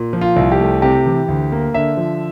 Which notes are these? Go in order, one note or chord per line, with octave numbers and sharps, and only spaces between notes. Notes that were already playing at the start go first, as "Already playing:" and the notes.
Already playing: A#2
F3
F4
C2
G4
A3
C3 G4
E3
D2
A#3
D3 E5
F3